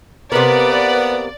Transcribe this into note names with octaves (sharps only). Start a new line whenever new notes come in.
C3 A#3 B3 B4 D5